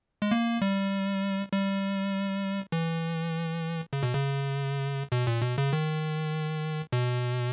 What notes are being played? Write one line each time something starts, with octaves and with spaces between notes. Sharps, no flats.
G#3
A#3
G3
G3
E3
C#3
B2
C#3
B2
A#2
B2
C#3
D#3
B2